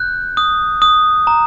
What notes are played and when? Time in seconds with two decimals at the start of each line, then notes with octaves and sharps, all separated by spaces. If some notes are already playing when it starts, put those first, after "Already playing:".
Already playing: F#6 G6
0.37 D#6
0.82 D#6
1.27 A#5